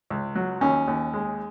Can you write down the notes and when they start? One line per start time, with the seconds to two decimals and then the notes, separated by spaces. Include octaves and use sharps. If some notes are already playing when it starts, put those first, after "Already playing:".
0.10 C#2
0.35 F#3
0.61 D#2 C#4
0.88 D#2
1.14 G#3